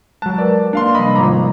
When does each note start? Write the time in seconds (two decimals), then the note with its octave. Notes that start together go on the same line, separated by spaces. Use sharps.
0.22 F#3 G#3 A5 F#6
0.38 A#4 B4 D5
0.73 A#3 D4 F5 C6
0.95 C3 F3 G3 D#5 B5 D#6
1.16 G#1 F4 A#5 D6